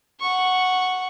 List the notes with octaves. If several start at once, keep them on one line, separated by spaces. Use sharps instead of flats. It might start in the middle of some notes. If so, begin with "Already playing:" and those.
F#5 C#6